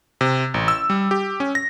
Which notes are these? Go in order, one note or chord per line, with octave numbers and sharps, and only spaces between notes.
C3
A1
E6
G3
G4
C#4
A#6